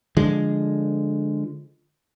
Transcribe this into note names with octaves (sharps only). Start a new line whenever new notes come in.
D3 F3 G#3